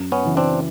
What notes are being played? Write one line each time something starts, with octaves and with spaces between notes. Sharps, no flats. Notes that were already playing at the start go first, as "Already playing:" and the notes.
Already playing: F#2
B3 C#4
C#3 E3
C4 D4